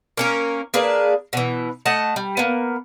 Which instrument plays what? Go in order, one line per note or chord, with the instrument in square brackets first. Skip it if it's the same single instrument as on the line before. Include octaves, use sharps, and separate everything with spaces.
[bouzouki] A#3 C#4 A#4
A#3 D4 G#4 B4
B2 E3
A3 D#5 F#5 A5
G3
A#3 B3